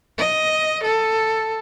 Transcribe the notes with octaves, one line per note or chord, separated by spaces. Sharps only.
D#5
A4